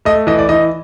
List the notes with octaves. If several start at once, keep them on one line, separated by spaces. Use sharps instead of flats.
A3 D#5
E3 D#5
D5
E3 D#5